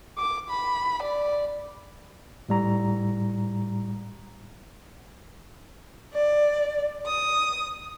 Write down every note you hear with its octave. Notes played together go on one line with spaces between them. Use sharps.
D6
B5
D5
A2 G3 A#5
D5
D#6